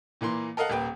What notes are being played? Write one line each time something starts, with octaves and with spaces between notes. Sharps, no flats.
A#2 E3 A#3 C6
A4 A#4 D#5 F5 F#5
D#1 A#3 B4 G5